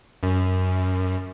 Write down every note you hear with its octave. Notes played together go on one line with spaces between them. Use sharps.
F#2